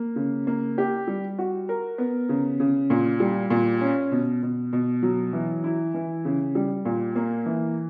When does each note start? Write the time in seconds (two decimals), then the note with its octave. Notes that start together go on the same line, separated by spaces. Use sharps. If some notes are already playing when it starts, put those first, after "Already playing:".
Already playing: A#3
0.16 C#3
0.47 A#3
0.78 G4
1.07 G3
1.39 F#4
1.69 A#4
1.98 B3
2.29 C#3
2.60 C#3
2.90 A#2
3.20 G3
3.50 A#2
3.81 C#4
4.12 B2
4.43 B2
4.73 B2
5.03 F#3
5.33 E3
5.64 E4
5.94 E3
6.25 C#3
6.55 G3
6.85 A#2
7.16 A#3
7.46 E3